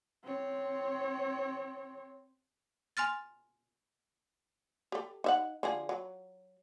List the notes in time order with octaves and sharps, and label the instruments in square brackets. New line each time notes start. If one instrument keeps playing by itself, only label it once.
[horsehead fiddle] C4 C#5
[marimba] G#5 C6 F6 A6
[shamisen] G4 A4
D#4 E5 F#5
D3 F3 G#4
F#3